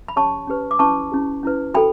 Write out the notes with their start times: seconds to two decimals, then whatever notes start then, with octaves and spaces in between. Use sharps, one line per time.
0.08 B5
0.16 C#4 G4 C#5 A5 C#6
0.47 C#4 G4 B4
0.71 D6
0.79 C#4 E4 B4 A5 C#6
1.12 C#4 E4 G4
1.43 C#4 E4 B4
1.74 F#4 A4 G5 B5